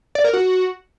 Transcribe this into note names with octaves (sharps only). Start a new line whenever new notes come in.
D5
A#4
F#4